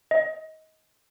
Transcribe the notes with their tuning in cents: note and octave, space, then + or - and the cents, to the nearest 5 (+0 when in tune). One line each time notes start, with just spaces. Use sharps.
D#5 +25